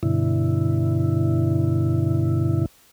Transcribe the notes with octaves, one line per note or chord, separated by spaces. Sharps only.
G2 B2 D3 E4